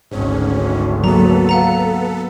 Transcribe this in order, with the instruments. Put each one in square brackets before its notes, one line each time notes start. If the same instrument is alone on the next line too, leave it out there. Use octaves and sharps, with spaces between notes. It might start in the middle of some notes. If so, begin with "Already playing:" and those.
[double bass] G#1 D2 [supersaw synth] G#2 C#4
[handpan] F#3 A#3 [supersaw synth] B3 A4 [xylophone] A#5
[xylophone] F5 F#5 A#5